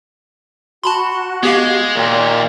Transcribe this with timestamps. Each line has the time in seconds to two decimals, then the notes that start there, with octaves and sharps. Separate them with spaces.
0.84 F#4 A5 B5 C6
1.43 G#3 B3 G4 F5
1.96 D#2 A#2 G5